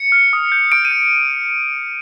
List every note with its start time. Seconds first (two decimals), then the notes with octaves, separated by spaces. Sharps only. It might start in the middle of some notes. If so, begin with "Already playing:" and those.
Already playing: C#7
0.12 F6
0.33 D#6
0.52 G6
0.72 D#6 D7
0.85 D#7
0.91 G6